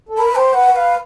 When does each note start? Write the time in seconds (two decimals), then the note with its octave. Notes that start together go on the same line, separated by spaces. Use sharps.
0.09 A4
0.18 A#4 B5
0.27 B4
0.35 C5 G5
0.53 B4 F#5
0.71 B4 F#5
0.76 F5